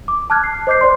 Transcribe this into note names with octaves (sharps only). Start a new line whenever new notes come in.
D6
A5 D6 F6 F#6 G#6
C7
C5 D#5 D6 G6 C7
C5 D5 C6